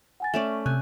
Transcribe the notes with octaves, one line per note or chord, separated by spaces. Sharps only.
F#5 G#5 A6
A3 C#4 D5 E5
C3 G#5 F#6